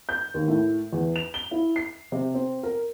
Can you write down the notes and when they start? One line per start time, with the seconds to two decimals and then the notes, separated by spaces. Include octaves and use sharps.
0.09 G6
0.34 D#2
0.48 A2
0.93 E2
1.16 F7
1.34 G7
1.51 E4
1.76 C7
2.12 C3
2.35 C4
2.63 A#4